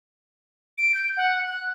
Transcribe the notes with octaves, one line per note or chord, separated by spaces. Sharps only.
D7
G6
F#5
F#6